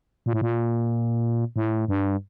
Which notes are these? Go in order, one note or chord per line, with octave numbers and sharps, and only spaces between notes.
A#2
A2
A#2
A2
G2